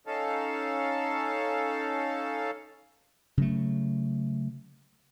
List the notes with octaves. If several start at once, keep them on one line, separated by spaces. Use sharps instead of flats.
C#4 D#4 A4 F5 A5
C#3 F#3 A3